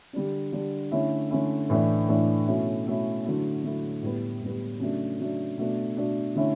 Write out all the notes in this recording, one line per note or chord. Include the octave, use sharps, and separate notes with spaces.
D3 G3 D4
D3 G3 D4
D3 A3 C#4 E4
D3 A3 C#4 E4
A2 E3 A3 D4
A2 E3 A3 D4
B2 A3 C#4 E4
B2 A3 C#4 E4
D3 F#3 A3 E4
D3 F#3 A3 E4
A2 G3 B3
A2 G3 B3
C#3 F#3 A3 D4
C#3 F#3 A3 D4
B2 A3 D4
B2 A3 D4
D3 A3 C#4 E4